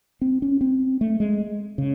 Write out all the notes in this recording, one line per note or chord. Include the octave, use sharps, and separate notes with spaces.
C4
C#4
C4
A3
G#3
C#3